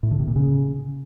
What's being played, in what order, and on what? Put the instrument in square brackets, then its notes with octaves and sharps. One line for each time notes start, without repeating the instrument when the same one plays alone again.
[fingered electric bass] A2
D3
C3
A#2
C#3